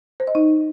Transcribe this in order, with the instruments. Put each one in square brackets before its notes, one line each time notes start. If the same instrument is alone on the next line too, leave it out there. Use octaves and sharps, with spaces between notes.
[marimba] C5
D#5
D#4